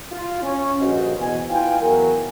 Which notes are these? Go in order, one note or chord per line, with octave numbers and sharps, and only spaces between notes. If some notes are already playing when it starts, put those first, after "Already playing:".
F4
C#4
A#1 G2 C#3 F#4 C5 D#5
E2 B2 G#5
E4 F4 B4 F5 G5 G#5
E2 F#3 E4 A#4